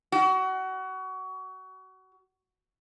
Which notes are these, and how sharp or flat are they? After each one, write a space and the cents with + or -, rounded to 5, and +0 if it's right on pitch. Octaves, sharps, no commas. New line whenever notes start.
F#4 +25